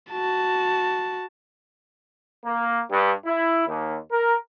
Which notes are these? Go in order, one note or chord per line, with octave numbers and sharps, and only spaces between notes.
F#4 A5
A#3
G2
E4
D#2
A#4